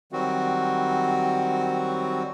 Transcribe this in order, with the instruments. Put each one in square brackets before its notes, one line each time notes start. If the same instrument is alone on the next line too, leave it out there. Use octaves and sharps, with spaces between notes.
[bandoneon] D#3 F#3 G3 C4 F#4